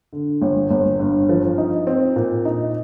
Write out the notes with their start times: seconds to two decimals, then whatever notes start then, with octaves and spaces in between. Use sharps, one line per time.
0.13 D3
0.42 G1
0.71 G1
1.00 G2
1.29 F3
1.58 D#4
1.87 C4
2.16 A#2
2.45 D#4